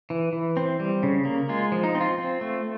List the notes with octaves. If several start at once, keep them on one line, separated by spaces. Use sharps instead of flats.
E3
E3
C4
G3
C#3
A#3
G#3 F4
F3
D#4
C4
F4
C4
A3